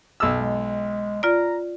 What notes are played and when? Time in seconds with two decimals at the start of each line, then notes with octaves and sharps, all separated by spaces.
0.20 B1 E6
0.40 G#3
1.23 F4 D5 A#5